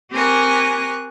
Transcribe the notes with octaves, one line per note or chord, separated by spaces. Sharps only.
C4 G4 A#4 G#5 C#6 F#6